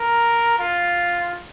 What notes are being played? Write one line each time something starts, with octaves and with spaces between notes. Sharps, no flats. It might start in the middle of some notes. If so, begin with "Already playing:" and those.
Already playing: A#4
F4